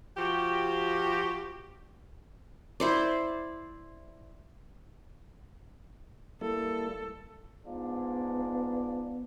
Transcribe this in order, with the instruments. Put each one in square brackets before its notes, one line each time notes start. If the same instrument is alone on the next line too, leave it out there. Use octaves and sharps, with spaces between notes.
[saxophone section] F3 F#4 G4
[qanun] E4 C5 D5
[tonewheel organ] G3 A#3 E4 [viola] A4
[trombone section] G#2 D4 F4 [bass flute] B3